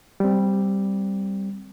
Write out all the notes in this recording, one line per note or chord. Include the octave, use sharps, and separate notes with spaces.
G3 C4